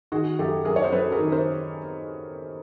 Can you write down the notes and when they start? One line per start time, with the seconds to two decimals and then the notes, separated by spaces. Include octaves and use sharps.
0.12 D#3 F#4 G#4
0.39 F#2 G4 A4
0.65 F#2 G#4 A#4
0.76 C#5
0.84 C5
0.92 F#3 A4 B4
1.12 G#4 A#4
1.19 D#3
1.32 A#4 C5